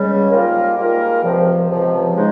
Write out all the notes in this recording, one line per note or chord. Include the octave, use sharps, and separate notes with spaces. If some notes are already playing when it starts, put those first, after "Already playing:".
Already playing: C#2 C#3 G3
G#2 G3 A#3 F4 A#4
G#2 G3 A#3 F4 A#4
C#2 C3 F3
C#2 C3 F3
C#3 G#3 D#4